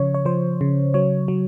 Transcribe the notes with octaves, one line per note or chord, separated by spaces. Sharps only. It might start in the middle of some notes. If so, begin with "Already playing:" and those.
Already playing: C#3 F3 C#5
C#5
F3 C5
C#3
F#3 C#5
F#3